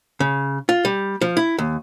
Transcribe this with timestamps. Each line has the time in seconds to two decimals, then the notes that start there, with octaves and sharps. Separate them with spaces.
0.20 C#3
0.69 F4
0.85 G3
1.21 F3
1.37 E4
1.58 D#2